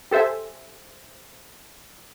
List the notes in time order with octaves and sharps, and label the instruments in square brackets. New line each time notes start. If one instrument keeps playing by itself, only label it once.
[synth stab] G4 A4 C5 E5 G#5